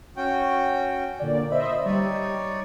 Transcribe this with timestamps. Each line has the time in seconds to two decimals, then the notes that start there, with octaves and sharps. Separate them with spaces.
0.17 C#4 F#4 G5
1.20 A#2 D3 D5
1.51 C5 D#5 E5 B5
1.86 G3 D#4 C#5 D5